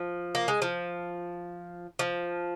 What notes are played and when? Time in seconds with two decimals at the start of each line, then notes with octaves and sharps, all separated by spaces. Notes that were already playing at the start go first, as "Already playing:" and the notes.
Already playing: F3
0.35 A#3
0.48 G#3
0.62 F3
1.99 F3